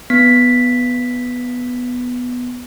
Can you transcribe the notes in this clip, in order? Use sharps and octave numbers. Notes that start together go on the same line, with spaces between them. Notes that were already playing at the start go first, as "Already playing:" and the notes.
B3 B6